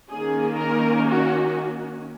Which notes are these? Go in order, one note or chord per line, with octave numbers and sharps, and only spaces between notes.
D#3 A#3 C#4 G#4
A#4
F#4